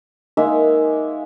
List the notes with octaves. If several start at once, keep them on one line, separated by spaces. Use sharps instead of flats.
G#3 A#3 D#4 E5